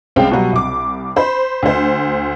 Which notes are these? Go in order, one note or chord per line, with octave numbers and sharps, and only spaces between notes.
C2 G#3 C4 C#4 F5 G5
B2 F#3 G3
C2 D6
C5 B5
D2 C5